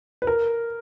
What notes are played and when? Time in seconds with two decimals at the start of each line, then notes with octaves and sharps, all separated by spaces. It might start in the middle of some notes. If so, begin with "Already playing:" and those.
0.22 B4
0.27 A#4